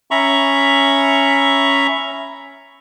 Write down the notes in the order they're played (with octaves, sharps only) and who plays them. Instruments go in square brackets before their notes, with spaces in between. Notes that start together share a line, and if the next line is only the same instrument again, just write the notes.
[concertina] C#4 E5 A#5 B5 C#6